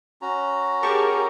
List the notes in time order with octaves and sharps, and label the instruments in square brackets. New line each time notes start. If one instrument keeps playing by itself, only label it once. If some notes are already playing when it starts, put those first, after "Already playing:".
[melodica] C#4 F#4 A#5
[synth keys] G4 A5 C#6 [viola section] G#4 A#4